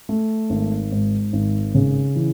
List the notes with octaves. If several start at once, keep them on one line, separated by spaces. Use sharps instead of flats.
A3
G#1
G#2
G#1
C#3
E3